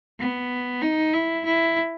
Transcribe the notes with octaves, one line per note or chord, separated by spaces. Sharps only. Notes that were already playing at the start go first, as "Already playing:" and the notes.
B3
D#4
E4
E4